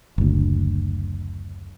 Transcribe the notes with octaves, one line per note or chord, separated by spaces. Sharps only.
F#1 D2